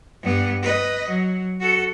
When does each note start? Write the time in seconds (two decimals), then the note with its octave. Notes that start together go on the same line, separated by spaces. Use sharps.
0.23 G2 B3
0.62 B4 D#5
1.08 F#3
1.60 F#4 A4